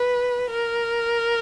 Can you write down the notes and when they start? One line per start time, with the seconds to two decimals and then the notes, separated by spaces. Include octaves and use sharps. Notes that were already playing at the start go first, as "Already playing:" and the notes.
Already playing: B4
0.50 A#4